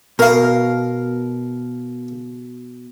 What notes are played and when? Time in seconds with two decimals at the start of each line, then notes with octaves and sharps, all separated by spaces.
0.19 B2 A#4 F5